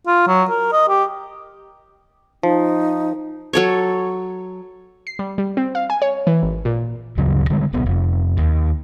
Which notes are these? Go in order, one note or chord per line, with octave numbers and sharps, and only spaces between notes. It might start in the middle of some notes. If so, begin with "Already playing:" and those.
F4
F#3
A#4
D#5
G4
F3 D#4
F#3 A4 C#5
C7
G3
G3
C4
F5
G#5
C#5
E3
G#1
A#2
D2 G2 C#3 F#3
D3 G3 G#3
D1 B1 B3
F1
D#2